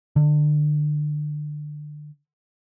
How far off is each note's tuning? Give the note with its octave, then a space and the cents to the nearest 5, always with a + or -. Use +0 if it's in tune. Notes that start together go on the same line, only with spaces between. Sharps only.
D3 +25